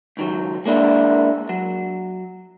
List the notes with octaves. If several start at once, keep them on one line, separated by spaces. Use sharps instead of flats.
C#2 D#3 F#3
G#3 A#3 D4 E4 A#4
F#3